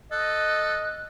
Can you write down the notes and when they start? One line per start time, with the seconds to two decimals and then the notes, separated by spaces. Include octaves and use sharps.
0.12 A4 D#5 F#6